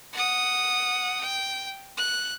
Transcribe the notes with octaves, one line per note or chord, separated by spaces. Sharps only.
F#5 D#6
G5
F#6